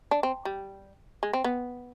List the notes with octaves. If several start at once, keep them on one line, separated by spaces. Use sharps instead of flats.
D4
C4
G3
G#3
C4
B3